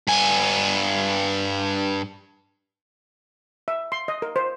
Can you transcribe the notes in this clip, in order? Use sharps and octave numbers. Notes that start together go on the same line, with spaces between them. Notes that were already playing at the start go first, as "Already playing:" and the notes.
G2 G#5
E5
C6
D#5
A#4
C5